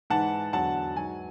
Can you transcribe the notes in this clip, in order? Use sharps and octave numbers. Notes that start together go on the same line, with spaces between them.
G#2 E3 F#5 A5
E2 D3 F#3 F#5 A5
G#2 F#3 G#5